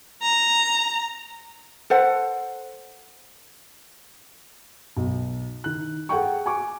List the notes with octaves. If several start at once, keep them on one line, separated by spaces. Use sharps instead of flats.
A#5
A4 C5 F#5
B1
D#3 F#6
G#4 A4 F#5 G5 C#6
G#5 C#6 D6